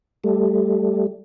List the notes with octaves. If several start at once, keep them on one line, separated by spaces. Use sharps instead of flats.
G3 A3